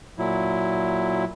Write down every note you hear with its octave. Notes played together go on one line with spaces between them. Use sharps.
A#2 F#3 E4